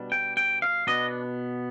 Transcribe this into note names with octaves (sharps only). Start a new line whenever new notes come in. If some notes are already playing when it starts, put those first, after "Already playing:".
Already playing: B2 G3 D4
G5
G5
F5
B2 B3 D4 D#5